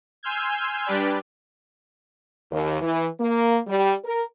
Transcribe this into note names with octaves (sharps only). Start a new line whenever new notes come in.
G#5 C6 E6 F6 G6 G#6
G3 D4 G4 B4 D5
D#2
E3
A#3
G3
A#4